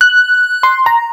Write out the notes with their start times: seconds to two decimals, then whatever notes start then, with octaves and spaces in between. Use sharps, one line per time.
0.01 F#6
0.63 C6
0.86 A#5